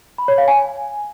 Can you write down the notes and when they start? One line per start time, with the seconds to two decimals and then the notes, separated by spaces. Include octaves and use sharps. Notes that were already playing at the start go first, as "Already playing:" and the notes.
0.18 B5
0.28 C#5
0.38 F5
0.48 G#5